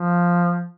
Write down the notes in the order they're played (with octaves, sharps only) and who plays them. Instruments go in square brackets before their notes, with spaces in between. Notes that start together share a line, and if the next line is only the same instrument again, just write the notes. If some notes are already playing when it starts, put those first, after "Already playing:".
Already playing: [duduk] F3